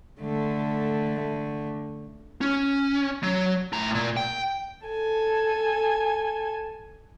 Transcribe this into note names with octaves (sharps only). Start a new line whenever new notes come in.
D3 A3
C#4
F#3
A2 A#5
A#2
G5
A4 G#5